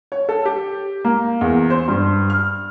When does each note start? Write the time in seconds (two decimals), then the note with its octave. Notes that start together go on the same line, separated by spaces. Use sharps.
0.12 C#5
0.29 A4
0.45 G4
1.04 A#3
1.41 E2
1.70 C5
1.88 G2
2.30 F6